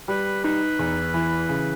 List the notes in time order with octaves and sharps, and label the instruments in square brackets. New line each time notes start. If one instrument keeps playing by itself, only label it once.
[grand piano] G3 [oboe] B4
[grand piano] D#4 [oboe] B4
[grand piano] E2
E3
C#3